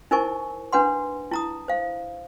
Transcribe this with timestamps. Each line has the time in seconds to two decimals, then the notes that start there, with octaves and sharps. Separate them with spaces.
0.11 D#4 E4 A#4 C5 G#5 C#6
0.73 D4 B4 F#5 C6
1.31 E4 A#5 D#6
1.68 C5 F5